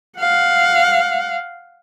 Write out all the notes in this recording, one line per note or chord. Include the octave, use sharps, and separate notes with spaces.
F5 F#5